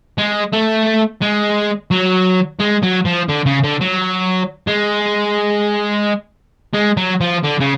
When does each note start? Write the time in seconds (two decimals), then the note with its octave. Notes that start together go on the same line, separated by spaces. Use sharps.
0.18 G#3
0.53 A3
1.22 G#3
1.91 F#3
2.60 G#3
2.83 F#3
3.06 F3
3.29 D3
3.46 C#3
3.64 D3
3.81 F#3
4.67 G#3
6.74 G#3
6.97 F#3
7.21 F3
7.43 D3
7.60 C#3